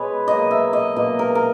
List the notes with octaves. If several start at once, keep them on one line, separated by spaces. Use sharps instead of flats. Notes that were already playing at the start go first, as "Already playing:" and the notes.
Already playing: B2 G#3 B4 C#5 D#5
B2 F#3 A#3 D#5
E5
D#5
B2 F#3 A#3 D#5
A#4
A#4